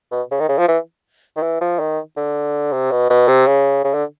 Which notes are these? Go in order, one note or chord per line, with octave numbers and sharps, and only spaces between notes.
B2
C#3
D#3
C#3
F3
E3
D#3
E3
F3
D#3
D3
C3
B2
B2
C3
C#3
C#3
D3